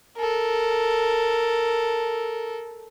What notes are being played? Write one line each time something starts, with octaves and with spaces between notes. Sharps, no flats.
A4 A#4